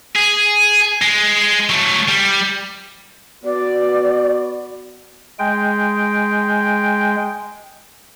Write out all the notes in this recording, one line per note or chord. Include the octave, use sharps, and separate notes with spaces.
G#4
G#3
F#3 A3
G3
B3 F#4 D5
G#3 G5